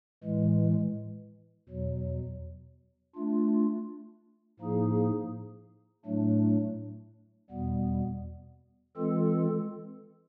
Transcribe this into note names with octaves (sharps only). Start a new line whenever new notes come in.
A2 E3 G#3
E2 B2 F#3
A3 D4 F4
A2 F3 A#3 D#4 G#4
A2 F#3 A3 D4
E2 B2 G3 B3
E3 G#3 C4 F4 A4